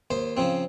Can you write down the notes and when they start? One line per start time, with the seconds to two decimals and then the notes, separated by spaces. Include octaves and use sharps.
0.11 D#2 C5
0.37 C#3 F3 C4